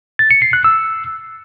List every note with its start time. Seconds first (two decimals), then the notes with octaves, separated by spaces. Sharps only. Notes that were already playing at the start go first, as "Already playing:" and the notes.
0.19 A6
0.31 C#7
0.42 C7
0.53 F#6
0.64 E6